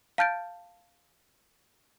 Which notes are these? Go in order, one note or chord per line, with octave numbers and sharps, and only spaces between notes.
F5 A5 F6 G6 A6 D7